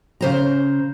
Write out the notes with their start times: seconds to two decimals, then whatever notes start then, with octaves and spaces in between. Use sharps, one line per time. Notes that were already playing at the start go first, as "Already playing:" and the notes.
0.21 C#3 C5 A#5